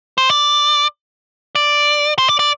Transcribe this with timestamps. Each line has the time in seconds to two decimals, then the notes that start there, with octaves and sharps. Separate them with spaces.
0.18 C5
0.30 D5
1.55 D5
2.18 C5
2.28 D5
2.39 D5